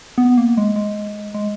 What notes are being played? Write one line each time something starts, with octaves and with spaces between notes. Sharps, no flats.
B3
A#3
G#3
G#3
G#3